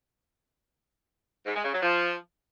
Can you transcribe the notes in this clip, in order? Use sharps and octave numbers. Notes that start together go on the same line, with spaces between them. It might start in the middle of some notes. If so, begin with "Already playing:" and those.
G#2
G#3
C#3
F#3
F3